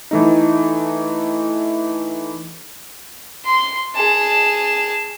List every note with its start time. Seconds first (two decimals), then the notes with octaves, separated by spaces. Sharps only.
0.11 E3 A3 D#4
3.45 C6
3.95 G#4 A5